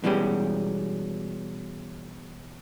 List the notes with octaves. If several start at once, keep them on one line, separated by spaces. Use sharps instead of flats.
B2 E3 G3 G#3 C#4 G4